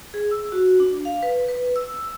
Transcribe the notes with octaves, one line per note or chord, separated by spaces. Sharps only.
G#4
E6
F#4
D4
F5
B4
B4
E6